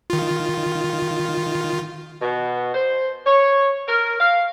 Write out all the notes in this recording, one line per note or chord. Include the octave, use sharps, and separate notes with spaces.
D#3 F4
B2
C5
C#5
A#4
F5